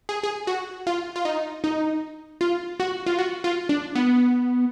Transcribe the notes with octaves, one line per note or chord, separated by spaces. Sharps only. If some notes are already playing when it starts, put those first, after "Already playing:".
G#4
G#4
F#4
F4
F4
D#4
D#4
F4
F#4
F4
F#4
F4
D4
B3